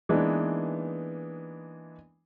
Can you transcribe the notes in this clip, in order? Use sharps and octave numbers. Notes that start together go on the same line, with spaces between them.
E3 G#3 A#3 B3 D4 D#4